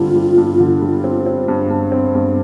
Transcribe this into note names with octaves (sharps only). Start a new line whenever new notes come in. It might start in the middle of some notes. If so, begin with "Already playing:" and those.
Already playing: G2 D3 G3 C4 F4
G3
G2
D3
G3
C4
C4
G2
G2
C4
G2